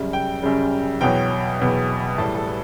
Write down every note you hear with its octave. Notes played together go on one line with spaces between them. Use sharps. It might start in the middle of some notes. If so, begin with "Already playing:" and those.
Already playing: F#2 C#3 G3
G5
F#2 C#3 G3
E2 B2 F#3 G5
E2 B2 F#3
A2 E3 G3 A5
A4
B4